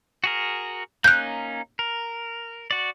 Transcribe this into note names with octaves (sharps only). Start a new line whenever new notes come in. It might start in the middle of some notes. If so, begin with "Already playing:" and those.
F#4 G#4 A#4
A#3 C#4 D#4 F#6 G6
A#4
F#4 D5